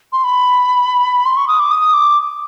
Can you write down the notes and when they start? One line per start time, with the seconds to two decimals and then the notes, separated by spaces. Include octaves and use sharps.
0.12 C6
0.24 B5
1.25 C6
1.36 C#6
1.47 D#6
1.59 D6
1.71 D#6
1.93 D6